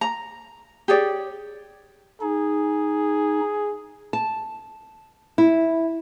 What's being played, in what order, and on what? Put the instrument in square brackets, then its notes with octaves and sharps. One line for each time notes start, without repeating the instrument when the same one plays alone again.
[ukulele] A#5
G4 G#4 C#5 D5
[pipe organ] D#4 [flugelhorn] G#4
[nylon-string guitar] A5
E4